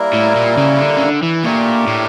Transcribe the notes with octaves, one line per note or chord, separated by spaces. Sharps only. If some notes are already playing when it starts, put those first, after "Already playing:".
Already playing: G3 A#3 E4 A#4
A2
A#2
C#3
D3
C#3
D3
E3
A#2 A3 D4 G4 A#4
A2